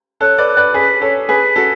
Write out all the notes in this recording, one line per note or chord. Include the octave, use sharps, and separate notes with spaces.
A4 C#5 F#6
B4 D5
B4 D5
G#4 B4 B6
A4 C#5
G#4 B4 B6
F#4 A4